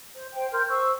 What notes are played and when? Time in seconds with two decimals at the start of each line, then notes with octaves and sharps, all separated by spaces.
0.14 C5
0.33 C5 G5
0.53 A#4 C6 F6 G6
0.67 C5 C#6 E6